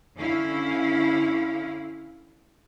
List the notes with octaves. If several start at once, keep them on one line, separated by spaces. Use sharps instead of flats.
D3 C#4 E4 F5